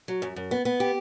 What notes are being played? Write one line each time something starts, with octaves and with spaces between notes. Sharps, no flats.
F#3
F#2
F#2
B3
B3
G4